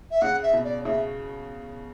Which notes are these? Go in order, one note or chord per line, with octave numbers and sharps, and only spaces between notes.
E5
C#3 F#5
E5
B2
D5
C#3 E5